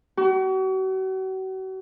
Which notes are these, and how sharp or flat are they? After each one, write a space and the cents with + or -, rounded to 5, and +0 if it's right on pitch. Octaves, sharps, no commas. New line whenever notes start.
F#4 +40